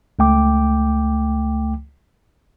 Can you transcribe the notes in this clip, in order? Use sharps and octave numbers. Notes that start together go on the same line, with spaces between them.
C#2 A3 G5 D6